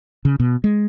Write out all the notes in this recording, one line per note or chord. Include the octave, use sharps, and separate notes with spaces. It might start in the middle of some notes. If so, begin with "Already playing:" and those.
C#3
B2
G#3